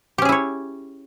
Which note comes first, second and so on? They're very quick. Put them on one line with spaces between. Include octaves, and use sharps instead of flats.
G4 C#4 G#4 E4 C#5